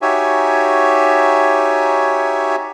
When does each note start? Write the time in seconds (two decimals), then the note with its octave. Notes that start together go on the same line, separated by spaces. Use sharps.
0.02 D#4 F#4 G4 C#5 E5 G#5